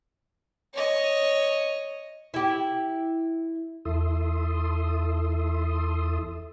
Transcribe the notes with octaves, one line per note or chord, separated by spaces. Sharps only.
C#5 D#5
E4 G4
E2 E4 A4 E5 C6 D#6